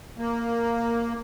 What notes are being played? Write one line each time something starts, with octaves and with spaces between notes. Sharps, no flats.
A#3